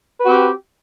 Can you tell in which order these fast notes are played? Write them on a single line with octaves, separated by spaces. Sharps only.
B4 F#4 C4 G4